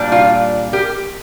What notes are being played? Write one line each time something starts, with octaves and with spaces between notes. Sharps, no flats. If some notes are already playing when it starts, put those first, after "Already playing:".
Already playing: A#2 G3 D4
F4
G4 A#4